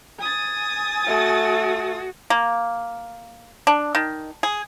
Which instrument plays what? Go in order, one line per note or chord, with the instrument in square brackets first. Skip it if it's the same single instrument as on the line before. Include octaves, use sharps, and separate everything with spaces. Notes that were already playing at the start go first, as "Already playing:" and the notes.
[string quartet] G#5 D#6 A6
[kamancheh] A3 [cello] F#4
[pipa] A#3
D4
D#3
G#4